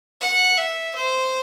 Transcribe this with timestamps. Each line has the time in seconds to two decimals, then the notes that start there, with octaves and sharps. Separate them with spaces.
0.21 F#5
0.57 E5
0.95 C5